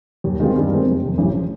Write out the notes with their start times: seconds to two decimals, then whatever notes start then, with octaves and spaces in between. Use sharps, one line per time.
0.24 D#2
0.40 D#3 G#3 C4 F4
0.56 G2
0.70 D#3 G#3 C4
0.86 F1
1.02 F2 C3
1.18 A1
1.32 F3